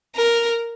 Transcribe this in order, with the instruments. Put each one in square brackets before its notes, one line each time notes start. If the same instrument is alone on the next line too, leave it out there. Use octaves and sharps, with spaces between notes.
[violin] A#4